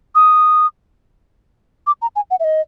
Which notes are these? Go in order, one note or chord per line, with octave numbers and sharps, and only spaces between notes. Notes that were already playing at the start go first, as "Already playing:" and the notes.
D#6
D6
A#5
G#5
F#5
E5
D#5